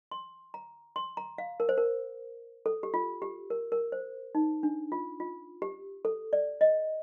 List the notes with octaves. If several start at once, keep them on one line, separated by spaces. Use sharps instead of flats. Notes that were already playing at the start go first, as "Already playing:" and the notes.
C6
A#5
C6
A#5
F5
A#4
C5
A#4
A4
G4
F4
G4
A#4
A#4
C5
D#4
D4
F4
F4
G4
A4
D5
D#5